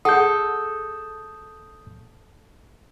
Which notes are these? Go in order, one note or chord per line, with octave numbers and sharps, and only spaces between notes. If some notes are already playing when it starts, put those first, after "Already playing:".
G#4 A4 F#5 D#6 G6